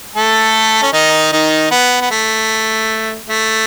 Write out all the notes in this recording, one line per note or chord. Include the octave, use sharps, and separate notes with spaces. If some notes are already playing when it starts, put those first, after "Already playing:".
A3 A4
C#4
D#3 D#4
D#3 D#4
B3
B3
A3
A3